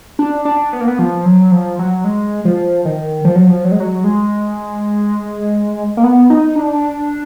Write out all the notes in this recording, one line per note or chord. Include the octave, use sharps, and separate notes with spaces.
D4
D4
B3
A#3
B3
F3
F#3
F3
F#3
G#3
F3
D#3
F3
F#3
F3
F#3
G#3
F#3
G#3
A#3
B3
D#4
D4